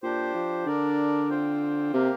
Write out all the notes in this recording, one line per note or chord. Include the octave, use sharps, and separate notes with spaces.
A#2 D4 G4 C5
F3
D3 D4 A#4 D5
C4 F4 C5 G5
C3 A#3 G4 A#4 F5